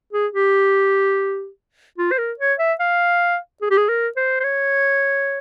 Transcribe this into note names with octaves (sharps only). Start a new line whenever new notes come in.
G#4
G4
F4
C5
A#4
C#5
E5
F5
G#4
G4
G#4
A#4
C5
C5
C#5